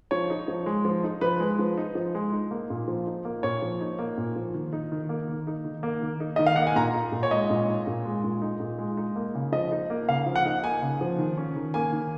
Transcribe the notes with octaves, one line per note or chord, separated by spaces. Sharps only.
F3 C#5
D#4
F3
G#3
F3
D#4
F3 B4
G#3
F3
D#4
F3
G#3
D#4
A#3
A#2
F3
D#4
A#3
A#2 C#5
F3
D#4
A#3
A#2
F3
D#3
D#4
D#3
A#3
D#3
D#4
D#3
A#3
D#3
D#4
D#3 D#5
F5
A#3 F#5
G#5
A#2 A#5
D#4
A#2
C#5
G#3 D#5
A#2
D#4
A#2
G#3
A#2
D#4
A#2
G#3
D#4
A#3
C#3
F3 D#5
D#4
A#3
C#3 F5
F3
F#5
D#4
A#3 G#5
C#3
F3
D#3
C#4
D#3
A#3 G#5
D#3